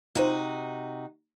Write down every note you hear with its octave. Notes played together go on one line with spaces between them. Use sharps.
C3 D#4 F4 F#4 C5